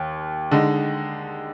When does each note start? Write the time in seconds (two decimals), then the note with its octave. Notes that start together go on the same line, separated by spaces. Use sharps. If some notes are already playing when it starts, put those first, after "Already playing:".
Already playing: D#2
0.51 D3 G#3 D#4